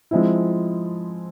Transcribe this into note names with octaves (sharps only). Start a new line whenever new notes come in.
F3 G#3 C4 E4